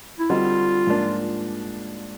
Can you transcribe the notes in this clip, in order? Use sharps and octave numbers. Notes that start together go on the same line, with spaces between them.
E4
D3 G3 C4 D#4 F4 F#4
G#2 F3 A#3 D4